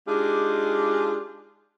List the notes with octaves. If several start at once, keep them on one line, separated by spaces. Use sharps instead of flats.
G#3 D4 D#4 F4 G4 G#4